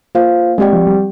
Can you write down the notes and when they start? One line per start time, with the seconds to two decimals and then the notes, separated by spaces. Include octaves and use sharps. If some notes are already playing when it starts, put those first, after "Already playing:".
0.15 A#3 F4 C5 F5
0.58 G#3 C4 G4 D5 G5
0.73 F3
0.87 G3